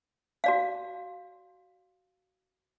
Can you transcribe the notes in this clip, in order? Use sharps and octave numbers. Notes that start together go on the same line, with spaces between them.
F#4 D5 F5